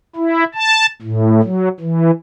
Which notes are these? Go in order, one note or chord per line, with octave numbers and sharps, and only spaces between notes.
E4
A5
A2
F#3
E3